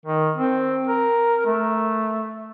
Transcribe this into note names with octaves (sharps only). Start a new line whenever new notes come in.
D#3
C4
A#4
A3